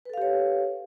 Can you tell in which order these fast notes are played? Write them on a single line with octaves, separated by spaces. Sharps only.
B4 A4 F5 G4 C#5